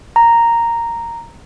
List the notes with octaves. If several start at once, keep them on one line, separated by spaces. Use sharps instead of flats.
A#5